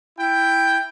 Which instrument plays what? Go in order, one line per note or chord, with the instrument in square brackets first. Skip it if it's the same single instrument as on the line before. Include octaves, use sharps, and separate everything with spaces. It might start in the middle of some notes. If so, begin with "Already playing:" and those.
[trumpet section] E4 G5